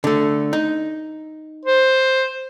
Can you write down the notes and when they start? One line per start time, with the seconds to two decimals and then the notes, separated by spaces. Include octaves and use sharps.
0.04 D3 A3
0.53 D#4
1.65 C5